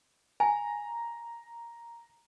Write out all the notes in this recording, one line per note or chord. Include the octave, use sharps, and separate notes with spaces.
G#5 A#5